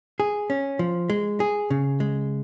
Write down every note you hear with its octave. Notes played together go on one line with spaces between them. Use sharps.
G#4
C#4
F3
G#3
G#4
C#3
G#3